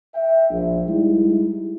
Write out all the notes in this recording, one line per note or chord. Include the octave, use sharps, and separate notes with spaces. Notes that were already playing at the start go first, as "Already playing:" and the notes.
E5 G5
A#1
G3 G#3 D#4 E4